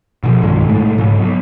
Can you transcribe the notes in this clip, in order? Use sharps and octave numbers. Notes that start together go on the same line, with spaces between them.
B2 E3 F3
B1 G2 D#3 G#3
A2 C3 G#3 A3
G#2 C#3
F#3 B3